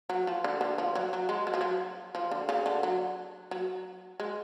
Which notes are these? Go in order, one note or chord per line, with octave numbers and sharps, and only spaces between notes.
F#3
F3
D3
D3
F3
F#3
F#3
G#3
F#3
F3
F#3
F3
D3
C#3
D3
F#3
F#3
G#3